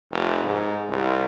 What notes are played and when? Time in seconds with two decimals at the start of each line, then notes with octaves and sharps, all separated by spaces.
0.11 F1
0.44 G#2
0.89 C2